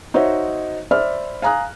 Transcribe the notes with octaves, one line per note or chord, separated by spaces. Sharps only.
D#4 F#4 C5 C#5 D#5 E5
C5 D5 E5 B5 F6
F5 G#5 A#5 D#6 F#6